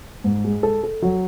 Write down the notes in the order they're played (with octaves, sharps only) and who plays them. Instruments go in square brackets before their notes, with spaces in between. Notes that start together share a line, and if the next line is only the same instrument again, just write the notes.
[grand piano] G#2
G#3
A4
A4
F#3